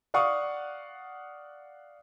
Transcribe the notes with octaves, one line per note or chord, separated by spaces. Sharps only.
D5 F5 F#5 C#6 D#6